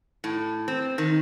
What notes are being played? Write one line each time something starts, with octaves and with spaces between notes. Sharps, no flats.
A2
C4
D#3